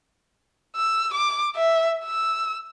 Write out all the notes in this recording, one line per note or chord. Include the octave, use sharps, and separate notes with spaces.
E6
D6
E5
E6